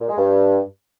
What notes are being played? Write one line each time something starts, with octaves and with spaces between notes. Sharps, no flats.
A#2
G#3
G2